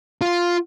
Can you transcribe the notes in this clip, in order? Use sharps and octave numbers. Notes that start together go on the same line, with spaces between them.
F4